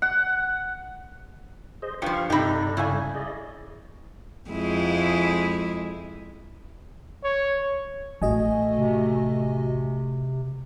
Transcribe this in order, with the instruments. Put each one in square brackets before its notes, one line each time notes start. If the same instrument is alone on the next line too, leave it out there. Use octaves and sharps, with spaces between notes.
[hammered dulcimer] F#5
[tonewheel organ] G#4 C5 D#5
[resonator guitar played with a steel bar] G2 F3 [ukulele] G4 B4 [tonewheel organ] F5 C#6
[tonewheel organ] G2 A4 D5 [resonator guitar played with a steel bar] C3 D#4 [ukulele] G4 B5
[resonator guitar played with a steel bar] C#3 [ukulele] E4 E5 G#5
[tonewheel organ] G#4 D5 D#5
[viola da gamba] F2 G#3 E4
[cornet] C#5
[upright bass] A1 [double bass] A3 [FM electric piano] F#4 D#5 G#5
[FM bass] C3